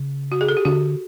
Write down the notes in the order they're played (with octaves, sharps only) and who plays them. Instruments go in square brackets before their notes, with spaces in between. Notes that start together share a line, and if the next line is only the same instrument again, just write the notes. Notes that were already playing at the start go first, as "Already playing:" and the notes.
Already playing: [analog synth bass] C#3
[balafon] F#4
G#4
A4
G4
[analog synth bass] D3 [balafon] F#4